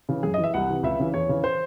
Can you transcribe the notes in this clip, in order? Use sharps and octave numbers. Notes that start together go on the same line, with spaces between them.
C#3 E3
F#2 G#4
D#5
E3
E5
C2 F#5
C3 E3
C#2 E5
C#3 E3
E2 C#5
C#3 E3
C5